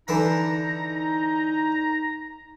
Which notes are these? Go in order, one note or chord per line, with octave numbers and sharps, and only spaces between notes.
D3 E3 D#4 E5 A#5